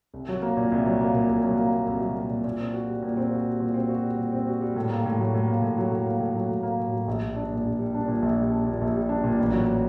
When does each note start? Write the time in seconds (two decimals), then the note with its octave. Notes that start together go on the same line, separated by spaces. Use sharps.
0.14 C2
0.29 F#3
0.42 A#3
0.57 A#2
0.72 C2
0.86 F#3
1.01 A#3
1.14 A#2
1.29 C2
1.44 F#3
1.57 A#3
1.73 A#2
1.87 C2
2.01 F#3
2.16 A#3
2.30 A#2
2.44 A#2
2.59 C4
2.74 F#4
2.88 G3
3.03 A#2
3.17 C4
3.32 F#4
3.46 G3
3.60 A#2
3.74 C4
3.89 F#4
4.03 G3
4.18 A#2
4.32 C4
4.47 F#4
4.61 G3
4.76 A2
4.90 A#3
5.05 A2
5.19 F#3
5.34 A2
5.48 A#3
5.62 A2
5.78 F#3
5.92 A2
6.06 A#3
6.20 A2
6.35 F#3
6.49 A2
6.63 A#3
6.79 A2
6.92 F#3
7.08 A#1
7.21 G3
7.36 D4
7.51 A#2
7.65 A#1
7.79 G3
7.94 D4
8.08 A#2
8.22 A#1
8.37 G3
8.51 D4
8.67 A#2
8.81 A#1
8.95 G3
9.09 D4
9.24 A#2
9.39 A1
9.52 F#3